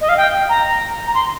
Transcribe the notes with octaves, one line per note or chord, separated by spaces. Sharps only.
D#5
F5
G5
A#5
A#5
C6